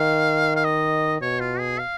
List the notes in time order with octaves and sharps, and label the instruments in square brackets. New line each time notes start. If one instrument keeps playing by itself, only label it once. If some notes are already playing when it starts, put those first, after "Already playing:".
Already playing: [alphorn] D#3 [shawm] F5
[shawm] F5
D#5
[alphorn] B2 [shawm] C#5
[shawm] F4
G#4
F5